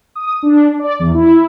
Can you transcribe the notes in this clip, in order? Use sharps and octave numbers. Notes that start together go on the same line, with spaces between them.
D#6
D4
D5
E2
E4